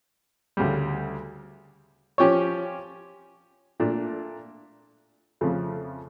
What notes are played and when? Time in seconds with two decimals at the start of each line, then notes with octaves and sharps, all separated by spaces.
0.57 D2 C#3 G3
2.18 F3 C#4 G4 C#5
3.80 A#2 A3 D4
5.41 F2 C#3 F3 A3